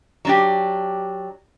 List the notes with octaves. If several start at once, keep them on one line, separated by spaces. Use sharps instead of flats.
F#3 D4 G4